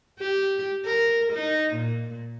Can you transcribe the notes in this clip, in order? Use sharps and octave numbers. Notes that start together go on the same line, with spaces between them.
G4
A#4
D#4
A#2